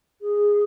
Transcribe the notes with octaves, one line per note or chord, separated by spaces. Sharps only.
G#4